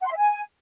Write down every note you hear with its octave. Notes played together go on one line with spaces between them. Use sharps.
F#5
C6
E5
G#5